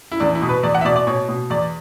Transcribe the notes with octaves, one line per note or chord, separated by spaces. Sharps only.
E4
E2 D4
E4
B2
B4
E2 D5
F#5
E5
B2 D5
D5
B2 C#5
B2
E2 D5